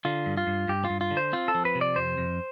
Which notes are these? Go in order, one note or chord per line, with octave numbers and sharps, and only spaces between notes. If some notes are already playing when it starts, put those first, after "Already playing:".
D3 F4
G2
F4
G2
G2 G4
F4
G2
F4
D3
C5
C4 F4
A4
F3
B4
C3
D5
F2 C5
F2